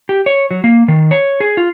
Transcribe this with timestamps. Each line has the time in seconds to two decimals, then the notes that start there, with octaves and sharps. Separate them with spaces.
0.09 G4
0.26 C#5
0.51 F#3
0.64 A#3
0.88 D#3
1.11 C#5
1.40 G#4
1.57 F4